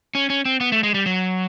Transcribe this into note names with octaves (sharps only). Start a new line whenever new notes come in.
C#4
C#4
C4
B3
A3
G#3
G3
F#3